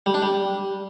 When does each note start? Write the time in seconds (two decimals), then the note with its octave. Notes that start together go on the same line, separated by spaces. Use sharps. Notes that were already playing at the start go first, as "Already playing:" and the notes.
0.06 G3
0.14 D4
0.22 G3